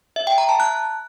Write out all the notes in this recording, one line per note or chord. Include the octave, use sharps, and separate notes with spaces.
E5
G5
A#5
A5
F#6